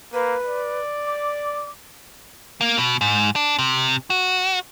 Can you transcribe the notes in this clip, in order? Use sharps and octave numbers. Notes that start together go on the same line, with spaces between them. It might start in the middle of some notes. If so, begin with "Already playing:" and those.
A#3 B4
D5
D6
A#3
B2
G#2
D4
C3
F#4